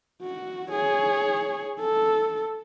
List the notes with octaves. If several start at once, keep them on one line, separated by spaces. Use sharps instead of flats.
F#4
G#4 C#5
A4